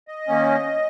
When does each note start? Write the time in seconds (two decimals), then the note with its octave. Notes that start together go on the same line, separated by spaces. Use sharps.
0.08 D#5
0.28 D#3 A#3 C#4